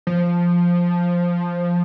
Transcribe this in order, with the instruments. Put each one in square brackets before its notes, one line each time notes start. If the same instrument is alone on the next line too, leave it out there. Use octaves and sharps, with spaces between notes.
[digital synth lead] F3